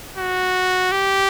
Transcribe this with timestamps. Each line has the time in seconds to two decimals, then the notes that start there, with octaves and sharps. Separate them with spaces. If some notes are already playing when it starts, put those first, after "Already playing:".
0.17 F#4
0.91 G4